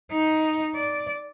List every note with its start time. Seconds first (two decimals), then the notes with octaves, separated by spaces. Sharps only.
0.12 D#4
0.75 D5